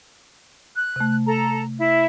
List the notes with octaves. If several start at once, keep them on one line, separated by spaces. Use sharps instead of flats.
F#6
C3 A3
A4 A#5
E4 E5